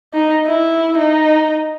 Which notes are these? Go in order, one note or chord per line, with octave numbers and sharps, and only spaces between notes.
D#4
E4
D#4